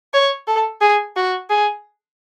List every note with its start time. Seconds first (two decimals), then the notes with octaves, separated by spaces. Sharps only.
0.14 C#5
0.48 A4
0.81 G#4
1.16 F#4
1.50 G#4